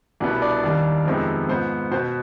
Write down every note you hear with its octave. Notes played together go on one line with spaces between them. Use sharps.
C2 B2 G3 B3 D4 D5
D4 D5
D#2 D#3 G3
F2 C3 D#3 G#3 B3
G#2 F3 B3 C5
B2 B3 C5